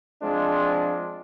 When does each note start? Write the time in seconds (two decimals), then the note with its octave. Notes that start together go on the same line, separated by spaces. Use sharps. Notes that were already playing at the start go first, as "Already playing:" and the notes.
0.22 F3 G#3 C4 D4 F4